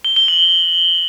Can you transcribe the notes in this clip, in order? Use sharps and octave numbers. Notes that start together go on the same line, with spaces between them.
G7
G7
F#7